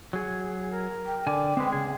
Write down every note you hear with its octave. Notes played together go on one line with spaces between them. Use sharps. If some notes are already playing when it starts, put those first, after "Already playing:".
F#3 G#4
A#4
G5
D3 D5 G#5
G#3 C4 B4
C#3 G#4